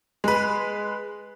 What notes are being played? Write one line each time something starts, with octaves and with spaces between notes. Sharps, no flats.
G#3 B4